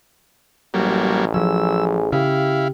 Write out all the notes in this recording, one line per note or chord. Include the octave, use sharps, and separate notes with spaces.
A1 F#3 G3 A#3
F3 F#3 G#4 E6
C#3 E4 G4 F5